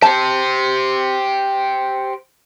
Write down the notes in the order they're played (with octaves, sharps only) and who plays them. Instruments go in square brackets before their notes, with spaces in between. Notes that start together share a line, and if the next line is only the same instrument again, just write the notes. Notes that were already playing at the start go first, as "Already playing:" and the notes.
[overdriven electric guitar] G4 C5 [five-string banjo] A5